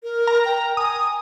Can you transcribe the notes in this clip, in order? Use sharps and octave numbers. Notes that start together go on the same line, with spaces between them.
A#4
A#5
G5
G#5 D#6